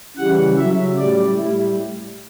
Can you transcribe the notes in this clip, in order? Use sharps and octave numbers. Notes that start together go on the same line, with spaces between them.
C#3 E3 G3 F#5
C#3 F#3 E5
A2 G3 D5
A2 G3 E4